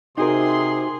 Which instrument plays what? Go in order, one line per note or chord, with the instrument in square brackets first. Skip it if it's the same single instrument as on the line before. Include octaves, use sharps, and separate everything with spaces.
[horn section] C3 C6 [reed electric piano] D#4 F#4 A#4 [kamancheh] G#4